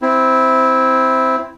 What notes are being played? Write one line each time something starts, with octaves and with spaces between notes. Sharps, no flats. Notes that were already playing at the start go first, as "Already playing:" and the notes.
C4 E4